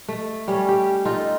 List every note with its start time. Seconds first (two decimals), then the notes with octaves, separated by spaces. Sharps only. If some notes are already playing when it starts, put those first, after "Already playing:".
0.08 A3
0.48 G3 C#4
0.69 G4
1.05 D#4 F4 A4